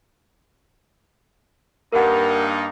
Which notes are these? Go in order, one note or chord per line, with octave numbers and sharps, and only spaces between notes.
G2 A#3 D#4 A#4 F#5